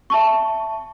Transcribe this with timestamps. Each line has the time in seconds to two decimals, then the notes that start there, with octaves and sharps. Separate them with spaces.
0.10 E5 A5 C#6